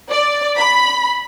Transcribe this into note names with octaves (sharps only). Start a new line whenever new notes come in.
D5
B5